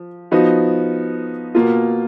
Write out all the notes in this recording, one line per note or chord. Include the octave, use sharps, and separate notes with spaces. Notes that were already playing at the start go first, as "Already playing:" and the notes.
Already playing: F3
F3 B3 D#4 F#4
B2 A#3 F4